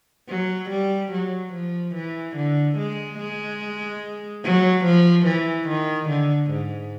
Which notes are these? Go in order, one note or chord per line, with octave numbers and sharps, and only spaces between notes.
F#3
G3
F#3
F3
E3
D3
G#3
G#3
F#3
F3
E3
D#3
D3
G#2